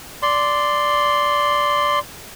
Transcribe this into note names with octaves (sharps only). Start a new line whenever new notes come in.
D5 C6